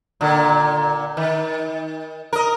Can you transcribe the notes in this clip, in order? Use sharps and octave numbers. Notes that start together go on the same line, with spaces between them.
A#2 D3
D#3
A#4 D#5